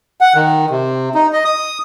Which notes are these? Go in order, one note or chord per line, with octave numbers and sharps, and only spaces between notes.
F#5
D#3
C3
D#4
D#5
D#6